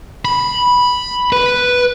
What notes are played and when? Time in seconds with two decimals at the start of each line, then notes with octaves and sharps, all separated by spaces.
0.25 B5
1.32 B4